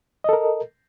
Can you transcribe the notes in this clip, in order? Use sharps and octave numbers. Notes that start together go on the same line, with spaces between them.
A4 A#4 D#5